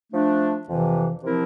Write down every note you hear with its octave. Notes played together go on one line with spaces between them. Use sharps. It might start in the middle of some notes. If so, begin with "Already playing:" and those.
F3 A3 D4
F2 C3 E3
C3 F3 C4 E4 A#4